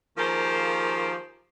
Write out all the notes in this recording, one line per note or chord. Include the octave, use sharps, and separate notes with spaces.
D#3 F3 A#3 G4 G#4 C5